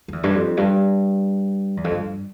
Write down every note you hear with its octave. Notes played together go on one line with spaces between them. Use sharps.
F2
E2
G2
F2
G2
E2
F2
G2